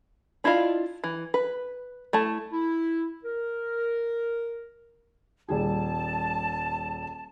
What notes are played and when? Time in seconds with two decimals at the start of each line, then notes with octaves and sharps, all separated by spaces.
0.44 D4 E4 F4 D#5 F5
1.04 E3
1.34 B4
2.13 A3 E4 A5
2.52 E4
3.24 A#4
5.49 D#1 G3 G#4 A5